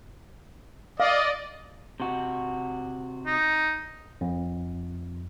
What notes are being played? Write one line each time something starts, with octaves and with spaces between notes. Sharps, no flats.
D5 D#5 F5
C3 F#4
D#4
F2